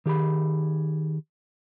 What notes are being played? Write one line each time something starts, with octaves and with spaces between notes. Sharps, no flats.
D#3 G4 G#4 B5